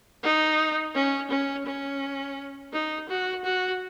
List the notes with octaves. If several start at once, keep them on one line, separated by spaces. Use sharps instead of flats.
D#4
C#4
C#4
C#4
D#4
F#4
F#4